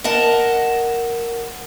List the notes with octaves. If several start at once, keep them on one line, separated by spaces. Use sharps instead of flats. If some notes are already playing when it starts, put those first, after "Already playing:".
A#4 D#5 F#5 A5